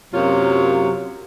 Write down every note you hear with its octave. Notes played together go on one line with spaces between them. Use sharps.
F#2 C3 F#3 A#3 F4 C#5